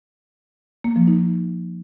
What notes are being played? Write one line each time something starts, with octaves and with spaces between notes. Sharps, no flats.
A#3
F3
D#4